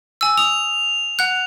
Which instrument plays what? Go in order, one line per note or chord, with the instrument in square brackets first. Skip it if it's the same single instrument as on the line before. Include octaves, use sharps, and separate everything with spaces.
[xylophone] G#5 E6
[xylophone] D#6 [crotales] F7
[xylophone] F#5 F#6